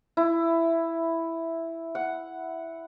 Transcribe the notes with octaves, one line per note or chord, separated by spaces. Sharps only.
E4
F#5